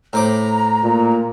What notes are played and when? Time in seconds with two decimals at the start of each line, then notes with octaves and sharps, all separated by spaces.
0.13 A2 C5 A#5 D6
0.83 A#2